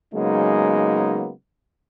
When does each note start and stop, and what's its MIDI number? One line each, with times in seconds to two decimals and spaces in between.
0.14 1.31 49
0.14 1.31 54
0.14 1.31 56
0.14 1.31 58
0.14 1.31 59
0.14 1.31 63